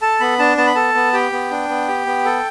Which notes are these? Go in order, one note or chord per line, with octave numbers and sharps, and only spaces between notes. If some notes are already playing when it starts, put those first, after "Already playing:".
A4 A5
B3 B5
D4 A5
B3 A5
B5
A4 A5
B3
G4 G5
B3
D4
B3
G4
B3
A4